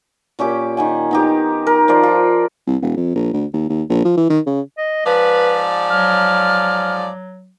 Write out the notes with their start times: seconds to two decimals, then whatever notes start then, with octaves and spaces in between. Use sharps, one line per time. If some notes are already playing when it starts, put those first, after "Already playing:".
0.39 A#2 C#4 G4 D6
0.77 D#3 F#5 G#5
1.11 B3 D#4 G4
1.67 A#4
1.88 F3 F4 C5 D5
2.03 F4
2.67 C2
2.82 E1
2.97 F2
3.15 A#1
3.33 D2
3.53 D#2
3.69 D#2
3.89 A#1
4.05 F3
4.17 E3
4.30 D#3
4.46 C#3
4.78 D#5
5.06 G#2 F3 B4 D5
5.90 F#3 F6